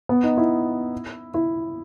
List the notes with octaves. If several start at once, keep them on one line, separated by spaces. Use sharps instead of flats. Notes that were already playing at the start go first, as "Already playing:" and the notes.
B3
D#4
E4
E4